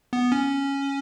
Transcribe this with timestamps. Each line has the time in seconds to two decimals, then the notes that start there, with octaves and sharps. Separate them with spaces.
0.13 B3
0.32 C#4